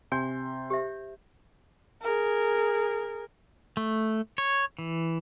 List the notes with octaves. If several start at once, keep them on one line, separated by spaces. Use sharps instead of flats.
C3 G#5 C6 G6
G4 C5 E5
G#4 A#4
A3
C#5
E3